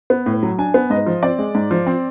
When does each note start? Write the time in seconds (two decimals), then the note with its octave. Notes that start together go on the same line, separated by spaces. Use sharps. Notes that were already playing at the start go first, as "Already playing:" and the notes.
0.10 B3
0.26 A2
0.43 F#3
0.58 D4 G#5
0.74 B3
0.90 G#2 D#5
1.06 F3
1.23 C4 D5
1.39 G#3
1.55 G#2
1.71 F3
1.86 C4